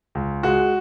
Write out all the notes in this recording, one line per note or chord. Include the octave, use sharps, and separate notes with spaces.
C#2
G#3 F#4